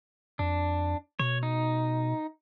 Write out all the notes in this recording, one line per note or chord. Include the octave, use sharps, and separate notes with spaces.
F2 D4
B2 C#5
D#4